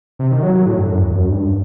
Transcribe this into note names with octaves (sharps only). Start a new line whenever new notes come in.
C3
D#3
F#3
F#3
A2
G2
F#2
E2
F#2
G2